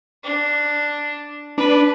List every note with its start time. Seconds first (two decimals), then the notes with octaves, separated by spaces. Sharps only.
0.24 D4
1.58 D4 B4